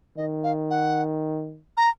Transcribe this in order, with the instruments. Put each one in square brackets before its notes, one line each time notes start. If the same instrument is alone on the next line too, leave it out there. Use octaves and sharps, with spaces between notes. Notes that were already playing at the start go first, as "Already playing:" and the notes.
[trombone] D#3 [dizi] D#5
[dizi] F5
F#5
A#5